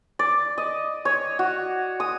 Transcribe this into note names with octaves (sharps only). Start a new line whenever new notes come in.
D5
D#5
C#5
F#4
D#6